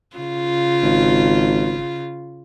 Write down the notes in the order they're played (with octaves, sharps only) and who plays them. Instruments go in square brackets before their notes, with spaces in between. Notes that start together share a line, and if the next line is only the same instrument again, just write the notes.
[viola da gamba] C#3 F4
[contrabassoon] G#1